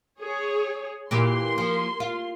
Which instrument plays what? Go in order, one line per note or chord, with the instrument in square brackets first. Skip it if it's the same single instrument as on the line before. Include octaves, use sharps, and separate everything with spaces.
[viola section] G#4 C#5
[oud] A#2 E3 G4 [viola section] A#3 C6
[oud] F3
F4